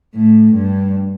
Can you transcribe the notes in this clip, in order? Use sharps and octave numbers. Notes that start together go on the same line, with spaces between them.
A2
G2